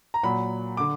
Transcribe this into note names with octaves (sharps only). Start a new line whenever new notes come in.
A#5
A#2 F#3 B5
D3 D6